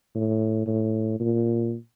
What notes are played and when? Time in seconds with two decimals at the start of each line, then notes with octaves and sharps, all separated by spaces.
0.15 A2
0.66 A2
1.20 A#2